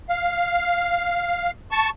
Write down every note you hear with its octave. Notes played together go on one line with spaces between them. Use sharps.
F5
A5 C#6